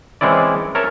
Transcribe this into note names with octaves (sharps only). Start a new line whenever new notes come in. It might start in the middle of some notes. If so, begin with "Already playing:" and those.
E3 G#3 C4 C#4 E4 D5
A#4 C#5 E5 A5